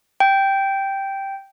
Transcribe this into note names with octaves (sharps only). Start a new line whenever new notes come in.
G5